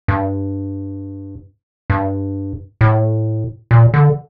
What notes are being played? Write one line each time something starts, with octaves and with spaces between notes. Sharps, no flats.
G2
G2
A2
A#2
D3